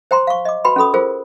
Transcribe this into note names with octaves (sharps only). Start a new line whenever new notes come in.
C5 G5 A#5 C6
F5 C#6
D#5 D6
F#4 B4 G5 B5 C6
C#4 F#4 A4 B5 D#6
F4 G#4 A#4 C5